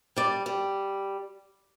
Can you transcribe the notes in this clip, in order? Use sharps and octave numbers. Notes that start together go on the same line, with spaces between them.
G3 D5
G3